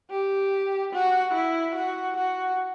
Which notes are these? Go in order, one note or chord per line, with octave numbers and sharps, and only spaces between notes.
G4
F#4
E4
F#4
F#4